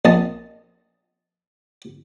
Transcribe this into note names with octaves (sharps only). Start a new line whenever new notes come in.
A#1 D#5 A5